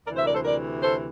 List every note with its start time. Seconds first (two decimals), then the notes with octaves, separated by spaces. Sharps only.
0.05 D2 C3 E3 A#4 D5
0.15 C5 E5
0.25 A#4 D5
0.34 A4 C5
0.45 A#4 D5
0.83 A4 C5